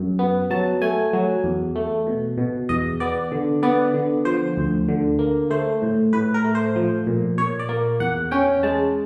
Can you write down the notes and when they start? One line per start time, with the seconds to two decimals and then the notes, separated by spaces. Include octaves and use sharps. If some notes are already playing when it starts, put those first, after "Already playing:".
Already playing: F#2
0.19 B3
0.50 F#3 A5
0.82 A3 G#5
1.13 F#3
1.44 E2
1.76 A3
2.07 B2
2.38 B2
2.69 E2 D#5
3.00 B3 D5
3.32 D3
3.63 B3 D5
3.94 D3
4.25 F3 C5
4.57 D2
4.88 D3
5.19 A#3
5.50 A3 C5
5.82 A2
6.13 A2 B4
6.34 A#4
6.44 A3
6.55 C5
6.76 F3
7.07 A#2
7.38 A#2 C#5
7.59 D5
7.69 A#3
8.00 E2 F#5
8.31 C#4 G5
8.63 G#3 A5